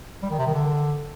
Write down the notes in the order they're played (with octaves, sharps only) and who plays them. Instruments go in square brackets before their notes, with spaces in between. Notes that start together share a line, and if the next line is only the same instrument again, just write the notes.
[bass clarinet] G3
D#3
C3
D#3
D3